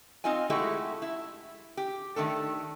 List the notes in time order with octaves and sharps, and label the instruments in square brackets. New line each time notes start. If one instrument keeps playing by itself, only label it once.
[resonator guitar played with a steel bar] C4 D#4 F4 D#5 G#5
G#3 A3 E4 F#4 G4 A4
E4
G4
D#3 A3 D4 A4